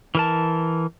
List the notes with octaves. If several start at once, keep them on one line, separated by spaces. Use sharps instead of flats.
E3 A#4 A5